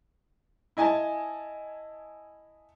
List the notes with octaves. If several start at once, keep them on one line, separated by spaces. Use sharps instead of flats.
E4 D#5 G#5 A5